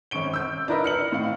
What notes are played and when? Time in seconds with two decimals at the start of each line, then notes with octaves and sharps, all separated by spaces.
0.11 G#1 C#4 C#6 D7 G7
0.34 E6 G6
0.68 D4 E4 A#4 B4 D#5 E5
0.84 F6 C#7 F#7
1.12 A2 F5